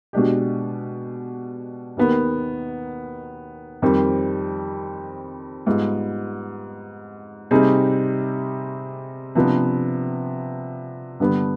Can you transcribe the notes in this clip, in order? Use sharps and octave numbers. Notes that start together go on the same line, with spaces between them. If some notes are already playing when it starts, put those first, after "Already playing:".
B2 G#3 D4 G4
D#2 D#3 B3
F2 D#3 G3 C4
G#2 G3 B3 F4 G#4
C3 G3 C4 D#4 G#4
C3 F3 B3 D4
G2 D3 G3 B3